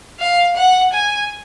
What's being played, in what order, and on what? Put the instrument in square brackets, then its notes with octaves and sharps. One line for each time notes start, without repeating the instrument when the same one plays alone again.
[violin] F5
F#5
G#5